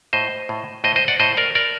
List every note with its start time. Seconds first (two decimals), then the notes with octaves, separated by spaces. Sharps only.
0.13 A2 C5 D#5
0.49 A2
0.84 A2 C5 D#5
0.96 C5 D#5
1.08 D5 F#5
1.20 A2 C5 D#5
1.37 A#4 D5
1.55 A#4 D5